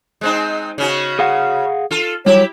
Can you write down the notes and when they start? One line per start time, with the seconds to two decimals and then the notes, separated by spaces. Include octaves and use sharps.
0.21 G#3 C4 D#4
0.78 C#3 C#4 F#4
1.19 G#4 F5 F#5
1.91 F4 A4
2.26 F#3 G3 E4 G4 C#5